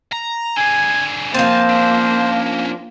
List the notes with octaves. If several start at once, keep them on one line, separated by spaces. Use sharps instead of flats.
A#5
D3 G#4 G#5
F3 A#3 C4 C5 G#5 A5
C#4 D4